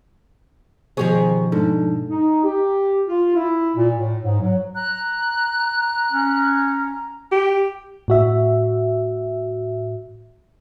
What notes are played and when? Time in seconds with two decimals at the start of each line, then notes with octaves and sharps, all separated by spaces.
0.97 B2 D#3 F3 G4 G#4 C5 C#6
1.52 G#2 D4 D#4 A4
2.09 D#4
2.44 G4
3.08 F4
3.36 E4
3.76 A#2
3.96 A2
4.23 G#2
4.41 F#3
4.75 A#5 F#6
6.11 C#4
7.32 G4
8.08 A2 F#4 E5